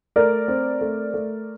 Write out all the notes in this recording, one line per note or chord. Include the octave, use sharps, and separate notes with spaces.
A3 A#4 D5
C4
A3
A3